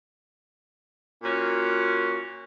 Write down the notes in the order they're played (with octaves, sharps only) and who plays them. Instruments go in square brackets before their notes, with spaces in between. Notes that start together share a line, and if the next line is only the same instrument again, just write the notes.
[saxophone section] A#2 C#4 F#4